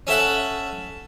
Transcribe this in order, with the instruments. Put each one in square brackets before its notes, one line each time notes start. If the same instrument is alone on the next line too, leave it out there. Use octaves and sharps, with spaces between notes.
[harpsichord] C#4 A4 E5 F#5